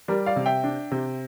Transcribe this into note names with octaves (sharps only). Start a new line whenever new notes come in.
G3 A#4 D5
D5 F5
C3
E5 G5
D4
C3